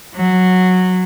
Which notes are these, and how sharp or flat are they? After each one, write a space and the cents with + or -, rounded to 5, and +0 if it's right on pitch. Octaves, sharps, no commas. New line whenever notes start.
F#3 -10